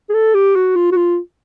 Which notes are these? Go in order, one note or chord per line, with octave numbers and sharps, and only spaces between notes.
G#4
A4
G4
F#4
F4
F#4
F4